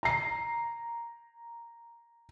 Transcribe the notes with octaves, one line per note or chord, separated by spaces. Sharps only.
A#5 C7